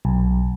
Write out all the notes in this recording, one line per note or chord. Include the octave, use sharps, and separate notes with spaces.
B1